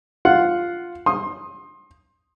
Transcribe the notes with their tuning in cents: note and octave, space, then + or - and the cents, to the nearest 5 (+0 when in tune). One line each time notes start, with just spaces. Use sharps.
F4 +0 F#5 +0
C6 +25 D#6 +0